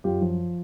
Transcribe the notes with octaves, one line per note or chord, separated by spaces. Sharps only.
F#2 F4 G4
F3